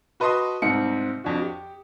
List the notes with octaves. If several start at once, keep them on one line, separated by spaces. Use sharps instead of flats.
F#4 B4 D#5 A5 C6 D#6
C2 G#2 C4 D#4 C#7
F2 D4 F#4
G4